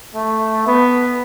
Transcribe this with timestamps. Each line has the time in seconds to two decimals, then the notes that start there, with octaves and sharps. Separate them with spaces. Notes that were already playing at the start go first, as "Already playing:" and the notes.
0.15 A3
0.67 B3